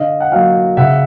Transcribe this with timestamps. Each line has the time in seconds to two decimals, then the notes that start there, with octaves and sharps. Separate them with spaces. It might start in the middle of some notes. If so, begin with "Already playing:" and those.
Already playing: D3 D#5 F5
0.20 F#5
0.32 F#3 A#3 F5 G5
0.77 C#3 E5 F#5